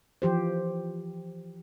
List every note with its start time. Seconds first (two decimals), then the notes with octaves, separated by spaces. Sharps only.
0.22 E3 F3 G4 C5